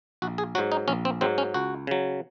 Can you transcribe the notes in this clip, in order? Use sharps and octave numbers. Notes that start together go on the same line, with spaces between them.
A#1 F#4
G#4
G#2 F#3 F#4
D#4
A#1 C#4
C4
G#2 F#3 C4
C#4
C#2 F#4
C#3 F#3